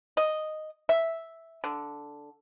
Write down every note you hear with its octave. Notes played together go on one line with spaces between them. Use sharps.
D#5
E5
D3